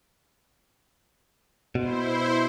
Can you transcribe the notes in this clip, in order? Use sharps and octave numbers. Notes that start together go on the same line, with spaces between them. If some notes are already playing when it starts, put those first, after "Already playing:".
B2 E4 C5